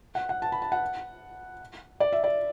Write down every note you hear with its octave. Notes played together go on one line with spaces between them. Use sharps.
F#5
F#5
A5
B5
A5
F#5
D5
E5
D5